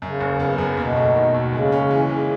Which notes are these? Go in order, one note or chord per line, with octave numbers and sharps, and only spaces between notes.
F#2 C#3
F#1
B3
F#2
D#2 B2
A3
D#3
D#2
C#3 G#3
C#4
E3
G#3